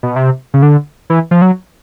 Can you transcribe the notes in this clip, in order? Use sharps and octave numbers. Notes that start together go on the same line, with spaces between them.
B2
C3
C#3
D3
E3
F3
F#3